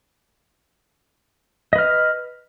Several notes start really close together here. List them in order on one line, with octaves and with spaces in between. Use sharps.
D#5 B4 F6